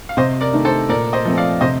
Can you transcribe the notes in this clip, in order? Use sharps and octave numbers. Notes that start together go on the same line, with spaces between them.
F5
C3 C5 D#5
A#4 D5
D#3 A3 D4
A4 C5
A#2 A#4 D5
C5 D#5
F3 A3 C4
D5 F5
C3 C5 D#5